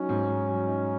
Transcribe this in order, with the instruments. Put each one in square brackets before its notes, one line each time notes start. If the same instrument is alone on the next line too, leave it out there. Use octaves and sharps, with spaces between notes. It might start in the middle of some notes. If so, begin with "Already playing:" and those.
Already playing: [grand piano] F#3 D#4 [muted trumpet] C#4
[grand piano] G#2
G#2
F#3
D#4